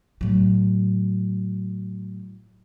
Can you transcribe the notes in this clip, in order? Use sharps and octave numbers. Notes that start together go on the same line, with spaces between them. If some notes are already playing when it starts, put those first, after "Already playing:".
A2 F#3